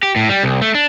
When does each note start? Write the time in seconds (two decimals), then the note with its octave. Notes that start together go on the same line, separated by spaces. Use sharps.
0.03 G4
0.16 A2
0.29 G3
0.43 C2
0.62 A3
0.75 D4